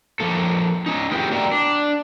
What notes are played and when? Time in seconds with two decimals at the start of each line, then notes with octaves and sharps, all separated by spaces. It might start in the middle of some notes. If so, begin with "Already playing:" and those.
0.20 F3 A#3 A4
0.86 C#4 D#4
1.11 A#3 E4 F4 G4 G#4 B4
1.31 F#4 A#4 D5 E5 G5 A#5
1.52 D4